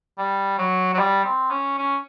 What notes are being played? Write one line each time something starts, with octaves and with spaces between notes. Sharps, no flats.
G3
F#3
F#3
G3
C4
C#4
C#4